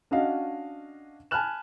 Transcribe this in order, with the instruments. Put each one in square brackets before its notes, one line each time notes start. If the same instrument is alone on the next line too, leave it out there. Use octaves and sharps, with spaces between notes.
[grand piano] C#4 D4 F#4 D#5 F5 F#5
G#5 A5 B5 F6 F#6 E7